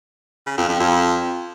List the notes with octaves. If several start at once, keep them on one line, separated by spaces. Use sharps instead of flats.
C#3
F2
F2
F2